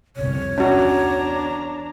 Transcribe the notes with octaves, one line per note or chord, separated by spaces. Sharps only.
G1 C2 F2 C#5
E2 C#4 D4 F#4 A#5